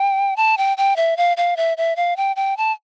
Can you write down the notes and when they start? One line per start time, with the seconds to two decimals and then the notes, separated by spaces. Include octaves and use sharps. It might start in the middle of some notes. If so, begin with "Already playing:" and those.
Already playing: G5
0.37 A5
0.58 G5
0.78 G5
0.96 E5
1.17 F5
1.37 F5
1.57 E5
1.77 E5
1.96 F5
2.17 G5
2.36 G5
2.57 A5